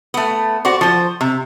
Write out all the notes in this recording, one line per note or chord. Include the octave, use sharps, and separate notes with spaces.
A3 B3
F#4 C5 D5
F3 C5
C3